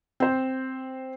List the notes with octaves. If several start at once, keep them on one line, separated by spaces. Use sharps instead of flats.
C4 C5